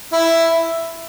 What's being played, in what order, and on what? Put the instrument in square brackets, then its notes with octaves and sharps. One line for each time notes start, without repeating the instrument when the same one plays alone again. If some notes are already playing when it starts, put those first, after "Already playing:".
[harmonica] E4